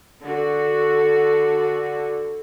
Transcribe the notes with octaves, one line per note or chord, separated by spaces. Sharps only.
D3 F#4